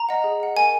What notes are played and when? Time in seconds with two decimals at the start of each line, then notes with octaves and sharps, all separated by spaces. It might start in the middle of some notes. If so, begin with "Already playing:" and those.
Already playing: A#5
0.09 D#5 F#5
0.24 G#4
0.40 D#5 F#5
0.55 A#4 G#5